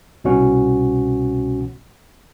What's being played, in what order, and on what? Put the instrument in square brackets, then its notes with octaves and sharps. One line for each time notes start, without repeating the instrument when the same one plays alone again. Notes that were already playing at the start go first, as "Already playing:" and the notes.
[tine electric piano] C2 B2 B3 C#4 F#4 F#5